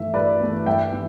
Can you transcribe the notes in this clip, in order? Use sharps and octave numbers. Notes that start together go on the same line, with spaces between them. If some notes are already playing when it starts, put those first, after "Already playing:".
Already playing: G2 E3 A3 E5
G2 B4 D5
E3 A3
G2 E5 G5
E3